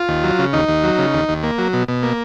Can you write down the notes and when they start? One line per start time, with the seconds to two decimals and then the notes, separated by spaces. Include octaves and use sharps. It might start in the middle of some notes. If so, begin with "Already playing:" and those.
Already playing: F4
0.09 D#2
0.24 F#3
0.39 C#3
0.53 D#2 D#4
0.68 D#2
0.84 F#3
0.98 C#3
1.14 D#2
1.29 D#2
1.43 A#3
1.58 F#3
1.73 B2
1.88 B2
2.03 A#3